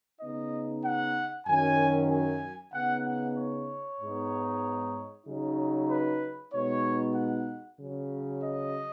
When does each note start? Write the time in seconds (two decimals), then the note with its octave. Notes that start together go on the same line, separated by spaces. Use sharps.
0.20 C#3 B3 D#4 D#5
0.84 F#5
1.46 F#2 D#3 F#3 C#4 G#5
2.09 G#5
2.73 C#3 B3 D#4 F#5
3.05 F#5
3.36 C#5
3.99 G#2 G#3 B3 D#4
5.27 C#3 F#3 D#4
5.89 B4
6.52 B2 G#3 B3 D#4 C#5
7.15 F#5
7.79 C#3 F#3 C#4
8.42 D#5